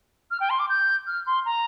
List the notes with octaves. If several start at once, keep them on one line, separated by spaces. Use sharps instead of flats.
F6
G5
C6
D6
G6
F6
C6
A#5